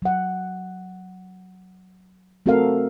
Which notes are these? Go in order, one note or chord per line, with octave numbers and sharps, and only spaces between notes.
F#3 F#5
A3 C4 F#4 A4 A#4 F5